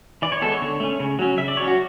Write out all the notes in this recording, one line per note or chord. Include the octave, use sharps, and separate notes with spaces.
E3 D5
C#5
G#3 B3 A4
C#5
D3
A3 C#4
C#3
F#3 C#4
C#3 E5
D5
F#3 C#4 C#5
F#4